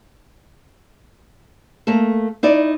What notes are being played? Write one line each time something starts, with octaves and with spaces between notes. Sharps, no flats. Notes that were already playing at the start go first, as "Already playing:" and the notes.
A3 A#3 A4
D#4 E4 D5